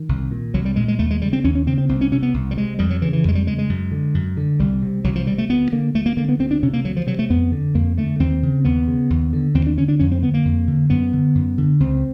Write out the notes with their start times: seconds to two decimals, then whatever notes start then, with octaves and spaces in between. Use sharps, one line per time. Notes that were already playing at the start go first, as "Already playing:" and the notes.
Already playing: D#3
0.09 C2
0.31 A#2
0.54 C2 F#3
0.65 G3
0.76 A#2 G#3
0.88 G#3
0.99 D#2 A3
1.11 G#3
1.22 C#3 G3
1.33 C4
1.44 D#2 C#4
1.55 C#4
1.66 C#3 C4
1.78 C4
1.89 C2 C4
2.01 C#4
2.12 C3 C#4
2.22 B3
2.34 C2
2.51 G3
2.57 C3 G#3
2.79 F2 G3
2.90 F#3
3.02 C#3 E3
3.13 E3
3.25 F2 G#3
3.35 G3
3.47 C#3 G#3
3.58 G#3
3.69 F#2
3.92 D3
4.14 F#2
4.37 D3
4.60 C2 G3
4.82 C3
5.04 C2 F#3
5.15 F3
5.27 C3 G3
5.38 A3
5.49 D2 B3
5.72 D3 A#3
5.95 D2 A3
6.06 A#3
6.17 D3 A#3
6.29 B3
6.39 D2 C4
6.51 D4
6.63 C3 C#4
6.73 A#3
6.85 D2 F#3
6.96 F3
7.07 C3 F#3
7.19 A3
7.30 F2 B3
7.52 D3
7.75 F2 A#3
7.97 D3 A3
8.20 D#2 C4
8.43 C#3
8.65 D#2 B3
8.88 C#3
9.10 D#2
9.33 D3
9.55 D#2 C4
9.66 D4
9.77 D3 C#4
9.88 D4
9.99 F2 C#4
10.12 C4
10.22 D3 B3
10.34 A#3
10.45 F2
10.67 D3
10.90 F#2 B3
11.13 D3
11.35 F#2
11.58 D3
11.80 C#2 C4